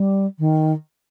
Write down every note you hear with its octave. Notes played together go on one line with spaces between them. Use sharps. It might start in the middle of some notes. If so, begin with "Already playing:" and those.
Already playing: G3
D#3